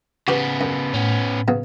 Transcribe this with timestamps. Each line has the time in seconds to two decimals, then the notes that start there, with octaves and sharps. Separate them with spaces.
0.28 C#3 B3 F#4 G4 B4
0.61 F#2
0.94 A2 B3 C#4
1.48 C#3 F#3 B3